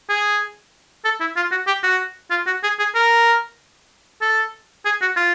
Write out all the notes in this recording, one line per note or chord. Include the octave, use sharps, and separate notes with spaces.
G#4
A4
E4
F4
F#4
G4
F#4
F4
F#4
G#4
G#4
A#4
A4
G#4
F#4
F4